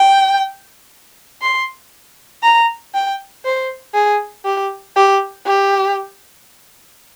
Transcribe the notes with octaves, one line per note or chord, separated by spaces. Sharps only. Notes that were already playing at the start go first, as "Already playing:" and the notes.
Already playing: G5
C6
A#5
G5
C5
G#4
G4
G4
G4